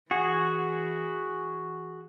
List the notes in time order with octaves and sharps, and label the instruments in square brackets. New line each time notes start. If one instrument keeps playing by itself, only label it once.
[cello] E3 [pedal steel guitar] F#4 G#4